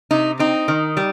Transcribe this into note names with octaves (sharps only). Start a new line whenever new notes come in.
C3 D#4
C4 D#4
D#3
G3